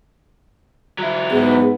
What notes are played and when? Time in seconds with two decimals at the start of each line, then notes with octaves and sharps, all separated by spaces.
0.99 F#3 E4
1.31 G#2 B3 G#4